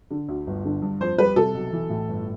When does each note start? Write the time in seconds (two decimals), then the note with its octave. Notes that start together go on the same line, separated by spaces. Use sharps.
0.11 D3
0.28 D2
0.47 G1
0.65 D3
0.82 G2
1.00 F2 C5
1.18 G3 B4
1.36 C3 A4
1.54 B1
1.73 E3
1.90 A2
2.09 G1